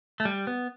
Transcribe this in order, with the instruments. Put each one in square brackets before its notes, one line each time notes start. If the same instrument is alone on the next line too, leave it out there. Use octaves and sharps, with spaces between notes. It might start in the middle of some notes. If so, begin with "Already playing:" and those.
[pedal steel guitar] A3
G3
B3